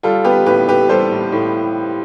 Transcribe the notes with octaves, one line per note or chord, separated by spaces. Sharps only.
G3 F4 A4
B3 G4 B4
A2 G4 B4
A2 G4 B4
G3 A4 C5
A2
A2